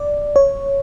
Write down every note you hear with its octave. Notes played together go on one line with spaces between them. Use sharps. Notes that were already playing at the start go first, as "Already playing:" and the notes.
Already playing: D5
C#5